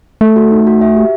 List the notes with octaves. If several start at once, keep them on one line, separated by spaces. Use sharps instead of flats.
A3 A4
F#4
D#4
F#4
E5
G4